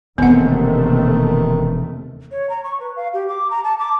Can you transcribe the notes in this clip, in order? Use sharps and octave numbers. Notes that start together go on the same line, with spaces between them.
E1 D#2 C3 D#3 A3 B3 C4 F#5
C#5
A#5
C#6
B4
F5
G4
D6
A#5
A5
D6